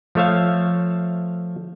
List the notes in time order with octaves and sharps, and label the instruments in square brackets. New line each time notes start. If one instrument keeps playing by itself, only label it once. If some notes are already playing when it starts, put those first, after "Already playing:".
[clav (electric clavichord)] F3 A3 C#5 E5 F5